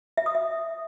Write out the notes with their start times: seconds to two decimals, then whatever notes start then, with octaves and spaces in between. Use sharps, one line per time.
0.17 E5
0.26 D#6
0.35 E5